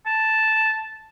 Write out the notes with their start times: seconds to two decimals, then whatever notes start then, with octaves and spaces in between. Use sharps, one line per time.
0.06 A5